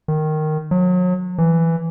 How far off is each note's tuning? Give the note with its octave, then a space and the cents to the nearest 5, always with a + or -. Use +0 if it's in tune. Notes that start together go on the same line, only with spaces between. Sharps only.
D#3 -10
F#3 -35
E3 +5